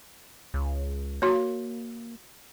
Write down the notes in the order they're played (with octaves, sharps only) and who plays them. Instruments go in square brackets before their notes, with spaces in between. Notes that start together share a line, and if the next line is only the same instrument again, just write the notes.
[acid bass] C#2
[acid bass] A#3 [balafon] F#4 C#5